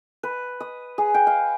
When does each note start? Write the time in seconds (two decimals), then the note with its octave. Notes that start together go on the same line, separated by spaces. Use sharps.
0.23 B4
0.60 D#6
0.98 G#4
1.14 G5
1.27 F5